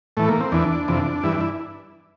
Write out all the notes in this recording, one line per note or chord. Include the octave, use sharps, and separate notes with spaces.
A2 E3 A3
A#3
C4
E2 E3 D4
F2 C3 E3
G2 E3 E4
D4
E4